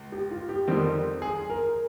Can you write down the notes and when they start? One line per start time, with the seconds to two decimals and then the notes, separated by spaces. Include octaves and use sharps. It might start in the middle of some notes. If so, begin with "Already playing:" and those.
Already playing: C#2
0.12 G4
0.31 F4
0.49 G4
0.68 F2 D#3 G3 C4
1.22 G#4
1.50 A#4